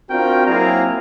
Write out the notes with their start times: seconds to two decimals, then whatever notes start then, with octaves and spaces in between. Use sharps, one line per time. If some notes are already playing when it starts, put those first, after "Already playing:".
0.10 C4 D4 F4 F#4 A#4 G5
0.46 F#3 A#3 C4 E4 G#4 A#5